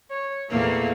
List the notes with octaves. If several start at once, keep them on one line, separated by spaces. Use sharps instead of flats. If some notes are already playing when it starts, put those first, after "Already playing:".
C#5
E2 A#2 A3 A#3